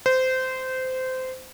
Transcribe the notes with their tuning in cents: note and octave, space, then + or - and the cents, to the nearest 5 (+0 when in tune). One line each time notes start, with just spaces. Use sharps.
C5 -20